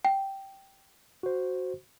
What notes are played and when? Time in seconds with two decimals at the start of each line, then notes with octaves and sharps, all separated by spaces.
0.05 G5
1.23 F#4 C5